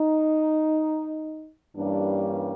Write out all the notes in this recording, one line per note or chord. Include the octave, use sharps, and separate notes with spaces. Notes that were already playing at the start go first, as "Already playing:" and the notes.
Already playing: D#4
G2 E3 G3 A#3 C#4 D4